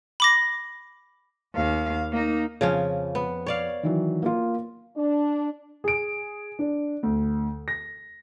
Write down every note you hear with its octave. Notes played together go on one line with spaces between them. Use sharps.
B5 D6 A#6
D#2 F5
A#3 D#4
F2 C#3 F3 C#4
B3
C#5 D5 F5
D#3 E3 F#3
A#3 F4
D4
G#4 D7
D4
D2
A#6